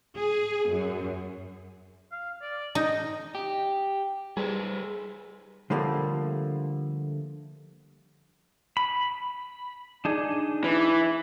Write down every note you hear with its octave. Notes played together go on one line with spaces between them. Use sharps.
G#4
F#2
F5
D5
D#4 D#5
G4
G3 G#4 B4 C5
D3 F3 G3 A3 A#3
B5
D4 D#4 G#4
E3